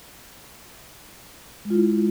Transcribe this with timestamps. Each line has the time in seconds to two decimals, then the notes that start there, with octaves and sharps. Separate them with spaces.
1.65 G#3
1.70 F4
1.75 E4